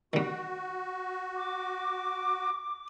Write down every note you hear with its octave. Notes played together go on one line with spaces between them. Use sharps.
D#3 G3 F#4
D6